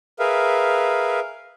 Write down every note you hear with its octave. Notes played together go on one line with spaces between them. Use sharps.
G#4 A#4 B4 E5 F5